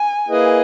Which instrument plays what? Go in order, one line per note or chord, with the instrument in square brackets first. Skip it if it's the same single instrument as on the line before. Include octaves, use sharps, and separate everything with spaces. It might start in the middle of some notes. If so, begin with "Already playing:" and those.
Already playing: [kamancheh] G#5
[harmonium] A#3 E4 G#4 B4 D#5